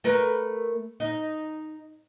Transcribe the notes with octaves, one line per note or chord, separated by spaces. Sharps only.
A3 A#4 B4
D#4